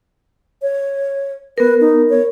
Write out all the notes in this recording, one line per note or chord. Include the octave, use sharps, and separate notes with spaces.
C#5
B3 A#4 B4
D#4
C#5